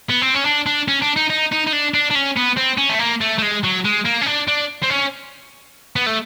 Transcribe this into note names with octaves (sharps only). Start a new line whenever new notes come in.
B3
C4
C#4
D4
D4
C#4
D4
D#4
D#4
D#4
D#4
D4
D4
D4
C#4
B3
C4
C#4
A3
A#3
A3
A3
G#3
F#3
G#3
A#3
C#4
D4
D4
C4
C#4
B3
A3